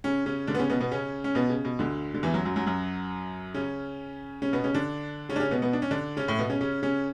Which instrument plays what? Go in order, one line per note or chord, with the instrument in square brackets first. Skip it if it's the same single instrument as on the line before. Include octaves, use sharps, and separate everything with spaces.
[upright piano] C#3 C#4
C#3 C#4
D3 D4
B3
C#3 C#4
B2 B3
B2 B3
C#3 C#4
C#4
B2 B3
C#3
B2
D2 D3
D3
E2 E3
F#2 F#3
F#2 F#3
F#2 F#3
F#2 F#3
C#3 C#4
C#3 C#4
B2 B3
C#3 C#4
D3 D4
C#3 C#4
D4
C#3 C#4
B2 B3
B2 B3
D4
C#4
D3 D4
C#3 C#4
A2 A3
B2 B3
C#3 C#4
C#3 C#4
C#3 C#4